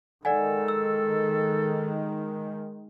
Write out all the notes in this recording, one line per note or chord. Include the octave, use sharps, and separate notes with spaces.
D#3 G#3 A4 D5 F#5 G#5
E6